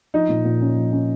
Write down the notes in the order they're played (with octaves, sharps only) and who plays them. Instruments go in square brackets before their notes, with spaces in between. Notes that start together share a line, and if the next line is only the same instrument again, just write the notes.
[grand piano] F3 [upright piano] D#4
[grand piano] A#2
A#2
C#4
F3
C#4